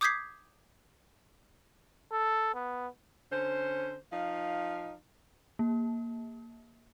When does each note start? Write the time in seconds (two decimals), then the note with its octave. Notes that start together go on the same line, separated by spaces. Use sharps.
0.01 D6 D#6 G6 G#6 B6 C7
2.12 A4
2.54 B3
3.31 D3 C#4 C5
4.12 F3 D#4 F5
5.59 A#3